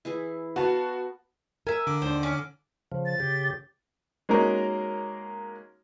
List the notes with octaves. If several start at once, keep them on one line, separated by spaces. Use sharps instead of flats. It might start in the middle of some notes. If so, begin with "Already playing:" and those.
E3 E4 G#4
B3 F#4 F5 A5
A#4 E5 G#5
D3 D6
D#2 D4 C5
C#4
C#3 F3
A6
C#3 G4
G#3 A#3 C#4 D#4 F#4 A#4